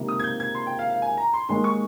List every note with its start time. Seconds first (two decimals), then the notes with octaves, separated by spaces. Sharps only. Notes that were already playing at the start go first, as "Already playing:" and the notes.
Already playing: C#2 C3 D#3 A#3
0.08 D#6
0.20 G#6
0.24 G6
0.40 G#6
0.55 C6
0.67 G5
0.79 F5
0.90 F5
1.02 G#5
1.17 A#5
1.33 C6
1.49 D#2 D#3 G#3 C6
1.64 C#6